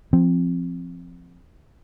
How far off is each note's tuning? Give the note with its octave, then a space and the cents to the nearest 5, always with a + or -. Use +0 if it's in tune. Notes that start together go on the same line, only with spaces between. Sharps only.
F3 -10 C4 +0